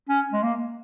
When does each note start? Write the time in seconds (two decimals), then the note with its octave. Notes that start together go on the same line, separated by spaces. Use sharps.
0.09 C#4
0.33 G#3
0.43 A#3